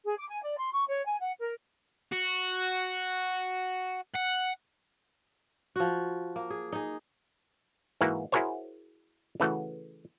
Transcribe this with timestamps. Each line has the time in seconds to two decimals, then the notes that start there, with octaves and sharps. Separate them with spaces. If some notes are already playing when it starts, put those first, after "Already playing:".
0.05 G#4
0.17 D6
0.29 G#5
0.42 D5
0.57 C6
0.72 C#6
0.88 C#5
1.05 G#5
1.19 F#5
1.38 A#4
2.12 F#4
4.14 F#5
5.76 F3 F#4
6.36 A#3
6.50 G#4
6.72 D#4 G#4
8.01 G#2 E3 A#3 F#4
8.32 E4 F#4 G#4 A#4 C5 C#5
9.40 C#3 E3 A3 F#4